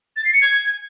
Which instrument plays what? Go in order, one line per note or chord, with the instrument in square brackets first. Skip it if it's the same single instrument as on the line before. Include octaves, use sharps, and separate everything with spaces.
[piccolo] A6
C7
C#7
G#6